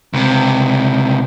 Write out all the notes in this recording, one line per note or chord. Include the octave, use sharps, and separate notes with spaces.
C#2 C3